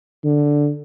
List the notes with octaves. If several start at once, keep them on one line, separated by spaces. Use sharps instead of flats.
D3